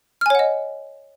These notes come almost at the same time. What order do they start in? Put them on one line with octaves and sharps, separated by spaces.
F6 G#5 C#5 F#5 D#5